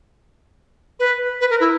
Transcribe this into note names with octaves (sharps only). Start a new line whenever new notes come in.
B4
B4
A#4
E4